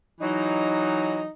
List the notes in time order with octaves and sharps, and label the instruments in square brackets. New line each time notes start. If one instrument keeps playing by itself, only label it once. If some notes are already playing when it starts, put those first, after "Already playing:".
[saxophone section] E3 F#3 D#4